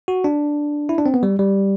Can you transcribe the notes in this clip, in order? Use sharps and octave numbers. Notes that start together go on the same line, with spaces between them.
F#4
D4
E4
D4
C4
B3
G3
G3